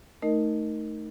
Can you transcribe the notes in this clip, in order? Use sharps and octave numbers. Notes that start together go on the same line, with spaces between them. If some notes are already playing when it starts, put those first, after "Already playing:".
A3 D#4 A#4 D#5